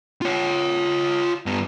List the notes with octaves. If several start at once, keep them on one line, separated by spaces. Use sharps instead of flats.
F4 C#5
G2 B3